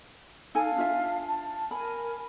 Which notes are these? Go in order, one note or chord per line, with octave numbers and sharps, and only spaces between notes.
D#4 A4 F5 G#5 A5
D4 F4 E5
A5
A#4 G#5 B5